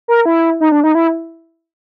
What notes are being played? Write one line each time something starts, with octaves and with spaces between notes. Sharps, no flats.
A#4
E4
D#4
D4
D#4
E4